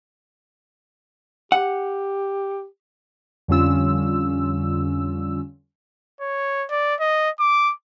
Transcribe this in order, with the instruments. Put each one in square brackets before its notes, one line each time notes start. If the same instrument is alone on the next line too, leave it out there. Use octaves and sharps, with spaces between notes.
[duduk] G4 [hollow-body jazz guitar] F#5
[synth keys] F2 D3 G3 C#4 F4 E6
[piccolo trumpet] C#5
D5
D#5
D6